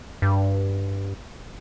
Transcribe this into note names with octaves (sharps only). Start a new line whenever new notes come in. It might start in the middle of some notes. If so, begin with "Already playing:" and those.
G2